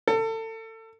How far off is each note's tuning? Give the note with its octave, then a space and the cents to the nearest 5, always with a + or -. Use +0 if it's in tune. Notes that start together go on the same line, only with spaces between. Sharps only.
A4 +30